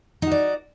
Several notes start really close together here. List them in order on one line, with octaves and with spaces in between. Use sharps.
D#4 F#4 D5